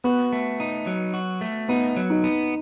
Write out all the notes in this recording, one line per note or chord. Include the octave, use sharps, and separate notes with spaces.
B3 F#4
A3
D#4
F#3
F#4
A3
B3 D#4
F#3
D#4
B3